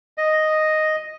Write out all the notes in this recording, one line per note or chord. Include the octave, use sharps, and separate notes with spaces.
D#5